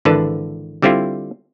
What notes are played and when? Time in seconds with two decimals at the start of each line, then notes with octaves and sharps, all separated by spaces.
0.05 G#1 D3 E3 B4 A5
0.82 D3 G3 C4 E4 F4